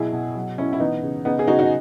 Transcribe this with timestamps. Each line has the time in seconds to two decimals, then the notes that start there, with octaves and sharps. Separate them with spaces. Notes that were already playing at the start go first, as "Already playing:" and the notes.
Already playing: B2 F#3 E4 G#4
0.13 B2
0.35 F#3
0.58 B2 C#4 E4
0.73 E4
0.80 E3 B3 D#4
1.03 C#3
1.25 C#3 B3 D#4
1.39 G#4
1.47 C#3 D#4 F#4
1.59 D#4 F#4